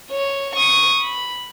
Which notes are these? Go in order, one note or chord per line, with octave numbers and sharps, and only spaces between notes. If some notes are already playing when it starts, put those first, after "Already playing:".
C#5
C#6 D#6
B5